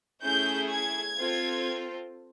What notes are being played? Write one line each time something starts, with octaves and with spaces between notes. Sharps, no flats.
A3 C#4 E4 G#4 G6
G#6
C4 F4 A4